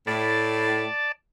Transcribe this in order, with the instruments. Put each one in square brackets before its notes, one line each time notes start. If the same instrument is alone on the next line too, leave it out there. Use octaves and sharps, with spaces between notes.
[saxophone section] A2 [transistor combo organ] D5 A5